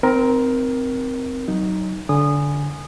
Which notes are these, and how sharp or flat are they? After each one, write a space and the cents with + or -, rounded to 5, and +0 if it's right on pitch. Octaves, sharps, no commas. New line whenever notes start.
C4 -15 D#4 -15 A#4 +15
F#3 +25 D#4 +0
D3 -20 G#5 +0 D#6 -20